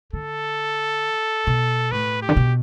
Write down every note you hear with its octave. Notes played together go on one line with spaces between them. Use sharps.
D3 A4
B2
A2 B4
G4
D3
B2